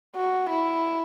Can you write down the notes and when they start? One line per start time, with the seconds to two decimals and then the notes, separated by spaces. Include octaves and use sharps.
0.16 F#4
0.50 E4